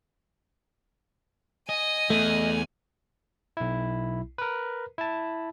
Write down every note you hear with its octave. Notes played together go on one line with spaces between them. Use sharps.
D#5 G#5
E2 A3
B1 E4
A#4 B4
E4 A5